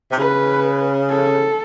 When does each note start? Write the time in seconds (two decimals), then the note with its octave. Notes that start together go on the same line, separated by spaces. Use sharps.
0.11 C3
0.18 C#3 B4
1.10 A4